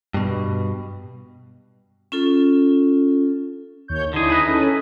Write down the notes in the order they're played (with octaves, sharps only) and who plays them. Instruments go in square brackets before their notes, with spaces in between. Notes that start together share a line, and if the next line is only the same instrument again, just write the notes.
[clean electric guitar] G2 B2
[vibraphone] C#4 F4 A4
[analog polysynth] D#2 C#5 G6
[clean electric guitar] D3 G#4 [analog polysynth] D#4 E4
[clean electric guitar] G#4 B4 D#5
[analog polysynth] C#4 A4